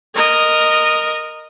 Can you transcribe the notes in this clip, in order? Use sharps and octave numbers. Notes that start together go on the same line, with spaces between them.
A#4 D#5